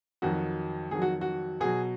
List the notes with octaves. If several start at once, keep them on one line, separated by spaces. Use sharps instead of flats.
F2 D#3 F#3 F#4
F2 D#3 F#3 G#4
F#4
F#4
B2 F#3 G#4